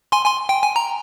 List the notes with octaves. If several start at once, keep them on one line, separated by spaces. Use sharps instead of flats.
G#5 C6
G#5 C6
G5
G#5
A#5